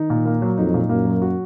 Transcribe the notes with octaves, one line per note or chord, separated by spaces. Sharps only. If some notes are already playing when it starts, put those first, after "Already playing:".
Already playing: D#3 D#4
A#2
A#3
F#3
F2 D#4
A#2
F#2 A#3
F#3
F#4